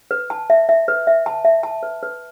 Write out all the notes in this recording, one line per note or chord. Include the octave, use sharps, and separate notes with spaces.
B4
A5
E5
E5
B4
E5
A5
E5
A5
B4
B4